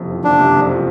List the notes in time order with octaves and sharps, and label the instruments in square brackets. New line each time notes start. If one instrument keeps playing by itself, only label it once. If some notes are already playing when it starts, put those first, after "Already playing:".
Already playing: [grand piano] F#1 F2 C3
F3
[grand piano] F#1 [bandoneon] D4
[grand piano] C3
F2
F3